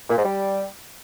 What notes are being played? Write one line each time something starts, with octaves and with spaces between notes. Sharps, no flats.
A#2
G#2
G3